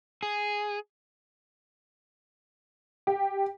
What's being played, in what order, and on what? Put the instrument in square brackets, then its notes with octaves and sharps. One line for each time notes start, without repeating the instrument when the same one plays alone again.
[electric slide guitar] G#4
[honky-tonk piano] G4